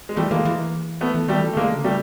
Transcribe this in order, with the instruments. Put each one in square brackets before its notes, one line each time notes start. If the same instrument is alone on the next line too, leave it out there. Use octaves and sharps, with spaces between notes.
[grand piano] G#3
[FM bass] E3 [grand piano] G3 A3
[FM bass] E3 [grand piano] G#3 A#3
[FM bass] E3
[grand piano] A3 B3
[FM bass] E3
[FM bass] D#3 [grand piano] G3 A3
[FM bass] E3
[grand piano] A3
[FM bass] D3 [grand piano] G#3 A#3
[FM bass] C#3
[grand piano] G3 A3